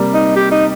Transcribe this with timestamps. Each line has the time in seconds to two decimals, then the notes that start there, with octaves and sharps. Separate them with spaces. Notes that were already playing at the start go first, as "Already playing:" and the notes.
Already playing: C3 G3 A#3
0.14 D#4
0.36 G4
0.52 D#4